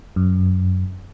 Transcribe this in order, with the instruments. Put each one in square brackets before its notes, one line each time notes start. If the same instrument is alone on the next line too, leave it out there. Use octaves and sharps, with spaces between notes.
[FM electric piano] F#2